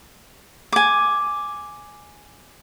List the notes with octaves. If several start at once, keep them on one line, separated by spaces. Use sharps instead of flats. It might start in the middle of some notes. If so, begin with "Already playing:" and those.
G#5 D6